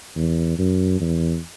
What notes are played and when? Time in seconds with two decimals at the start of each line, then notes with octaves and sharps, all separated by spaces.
0.16 E2
0.58 F#2
1.00 E2